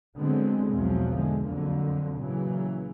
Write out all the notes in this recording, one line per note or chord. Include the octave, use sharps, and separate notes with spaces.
D3 F#3 G#3 B3 C4
B1 E2 B2 F3 F#3
D3 G#3
F2 D3 F#3 A#3
A#2 C#3 E3 F#3